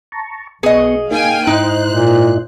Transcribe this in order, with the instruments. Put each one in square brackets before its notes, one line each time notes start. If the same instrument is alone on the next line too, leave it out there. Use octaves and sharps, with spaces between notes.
[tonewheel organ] A5 A#5 C#6
[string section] B1 [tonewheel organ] B3 C#6 [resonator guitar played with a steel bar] G#4 D#5
[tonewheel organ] A#3 D#4 [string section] F5 G5 G#5
[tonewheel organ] G#2 E4 D#5 [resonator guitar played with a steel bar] D#4 [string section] C5 F#6
[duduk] A#2